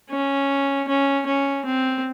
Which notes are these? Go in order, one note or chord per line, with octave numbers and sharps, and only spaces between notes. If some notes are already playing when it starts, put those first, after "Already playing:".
C#4
C#4
C#4
C4